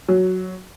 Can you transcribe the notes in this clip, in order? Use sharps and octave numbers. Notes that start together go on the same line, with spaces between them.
F#3